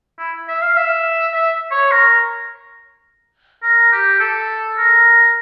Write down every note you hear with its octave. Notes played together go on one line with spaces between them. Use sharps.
E4
E5
F5
E5
E5
C#5
A#4
A#4
G4
A4
A#4